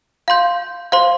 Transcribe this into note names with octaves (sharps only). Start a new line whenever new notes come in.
F5 C6 G6
C5 F5 C6